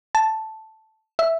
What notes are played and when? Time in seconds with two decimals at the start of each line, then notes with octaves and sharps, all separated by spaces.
0.15 A5
1.19 E5